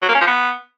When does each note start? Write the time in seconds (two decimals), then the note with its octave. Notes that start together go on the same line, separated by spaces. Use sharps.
0.03 F#3
0.09 A#3
0.15 C#4
0.21 F3
0.27 B3